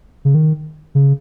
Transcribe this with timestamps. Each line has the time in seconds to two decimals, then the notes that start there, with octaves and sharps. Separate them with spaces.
0.25 C#3
0.35 D#3
0.95 C#3